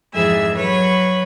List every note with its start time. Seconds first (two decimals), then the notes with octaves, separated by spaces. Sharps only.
0.14 F2 G#2 E3 G#4 E5 E6
0.55 F#3 B4 C#5